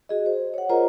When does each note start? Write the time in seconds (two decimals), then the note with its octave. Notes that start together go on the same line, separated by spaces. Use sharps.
0.09 F#4 G#4 D#5
0.26 C5
0.54 C#5 F#5
0.69 F4 G#4 A#4 C5 D#5 A#5